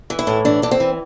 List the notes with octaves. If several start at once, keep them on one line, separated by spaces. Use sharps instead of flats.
E3
E4
A2
E3 D4
E3 D4
C4
E3